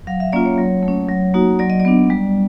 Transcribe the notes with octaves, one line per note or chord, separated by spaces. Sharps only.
F#3 F5
E5
A#3 C#4 F4 D5
C#5
F#3
A3
C#4
F#3
A#3 D#4 F#4
F#3 D5
D#5
D5
B3 D4
G3